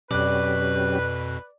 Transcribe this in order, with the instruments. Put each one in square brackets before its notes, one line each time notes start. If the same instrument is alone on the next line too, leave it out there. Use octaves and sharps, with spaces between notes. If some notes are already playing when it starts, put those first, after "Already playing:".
[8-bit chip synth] F2 B2 [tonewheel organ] F#3 C#4 G4 [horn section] B4 [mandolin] D5